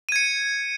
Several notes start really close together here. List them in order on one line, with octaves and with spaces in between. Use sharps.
D#7 G#6 C#7